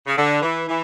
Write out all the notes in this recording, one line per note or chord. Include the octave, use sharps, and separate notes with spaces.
C#3
D3
E3
E3